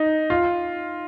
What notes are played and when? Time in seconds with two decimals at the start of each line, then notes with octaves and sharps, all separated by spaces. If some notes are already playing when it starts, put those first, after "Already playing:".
Already playing: D#4
0.30 F4